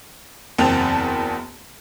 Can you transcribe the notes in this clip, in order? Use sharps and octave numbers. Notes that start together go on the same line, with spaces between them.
F#1 E2 C4 G5 A5 F7